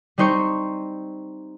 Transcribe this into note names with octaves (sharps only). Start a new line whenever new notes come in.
G3 C4 D#4 C5 C#6 C#7